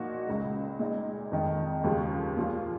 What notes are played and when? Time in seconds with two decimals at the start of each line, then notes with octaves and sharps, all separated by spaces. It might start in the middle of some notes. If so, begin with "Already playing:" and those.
Already playing: A#2 F3 A#3 D#4 F#4
0.27 C#2 C#3 G#3
0.79 A#2 G#3 D#4
1.32 F2 D#3 G#3
1.84 D#2 C#3 F3 G#3
2.37 A#2 F3 A#3 F4